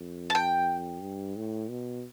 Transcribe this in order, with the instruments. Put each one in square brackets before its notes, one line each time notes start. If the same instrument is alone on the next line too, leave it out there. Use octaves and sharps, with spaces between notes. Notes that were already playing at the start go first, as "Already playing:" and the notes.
Already playing: [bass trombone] F2
[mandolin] A5
G5
[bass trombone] G2
A2
B2